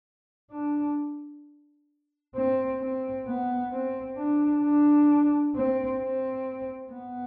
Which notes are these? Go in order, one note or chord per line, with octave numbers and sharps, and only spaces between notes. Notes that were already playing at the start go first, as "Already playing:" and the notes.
D4
C4
C4
B3
C4
D4
D4
C4
C4
B3